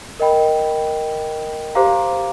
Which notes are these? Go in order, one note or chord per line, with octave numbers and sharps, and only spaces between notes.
A#4 D#5 G5 B5
G4 C5 F5 A#5 D6